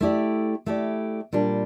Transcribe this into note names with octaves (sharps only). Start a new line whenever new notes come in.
A3 E4 G4 D5
A3 E4 G4 D5
A#2 G3 D4